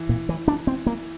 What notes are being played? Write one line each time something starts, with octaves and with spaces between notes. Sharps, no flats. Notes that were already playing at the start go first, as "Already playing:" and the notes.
Already playing: E3
A#2
E3
D4
C4
A#3